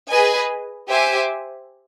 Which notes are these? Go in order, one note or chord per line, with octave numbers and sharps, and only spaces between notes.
G#4 B4 D#5 G#5
G4 C5 E5 G#5